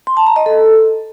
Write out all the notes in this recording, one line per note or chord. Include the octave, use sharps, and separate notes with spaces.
C6
A5
A#5
D#5
A4